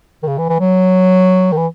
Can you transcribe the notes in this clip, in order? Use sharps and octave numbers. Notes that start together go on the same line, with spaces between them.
D#3
C#3
E3
E3
F#3
D#3
E3